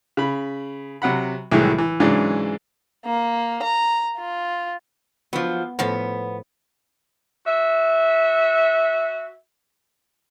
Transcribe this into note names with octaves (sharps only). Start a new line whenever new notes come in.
C#3 B5
C3 F#3 F#5 B5
C2 A2 D#3 E3 F#3 G#3
E3
G#2 C#3 E3 F#3 G#3 D4
A#3
A#5
F4
F3 F#3 B3
A2 F3 B3 F5
F#4 E5